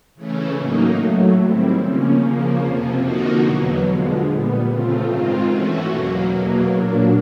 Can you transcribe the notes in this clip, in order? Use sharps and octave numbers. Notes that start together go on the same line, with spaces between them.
C#3 E3 A3 C#4
A2 F#3 A#3 D#4
A2 F#3 A3
D#3 G3 C4 E4
C#3 F3 A#3 C#4
C#3 F3 A#3
F2 C3 F3
D3 F3 A#3 D#4 F#4
E2 B2 F#3 B3
D3 F3 G#3
A#2 G3 B3
C#3 F3 A3 C4 F4
G#2 D#3 G#3 C4 F4
E3 A3 C#4 F#4
E2 B2 F#3 A#3
E2 B2 F#3 A#3
A#2 F#3 A#3 D4